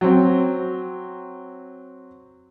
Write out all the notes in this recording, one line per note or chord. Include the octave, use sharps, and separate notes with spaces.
F#3 C4